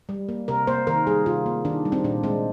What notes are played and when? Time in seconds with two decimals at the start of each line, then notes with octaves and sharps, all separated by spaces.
0.09 G3
0.29 A#3
0.48 C3 A#4
0.67 A#3 C5
0.87 D#3 A#4
1.07 G3 G#4
1.26 C3 F4
1.46 A#3
1.65 D#3 D4
1.85 G3
1.92 C4
2.04 A#2 D4
2.24 G#3 C4